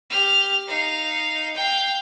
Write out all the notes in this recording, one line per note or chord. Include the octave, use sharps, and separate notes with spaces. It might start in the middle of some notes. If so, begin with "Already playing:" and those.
G4 F6
D#4 F5
F5 G5